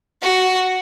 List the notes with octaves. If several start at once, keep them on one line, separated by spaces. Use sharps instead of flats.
F#4